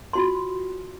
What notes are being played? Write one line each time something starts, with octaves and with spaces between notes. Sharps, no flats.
F4 F#4 C6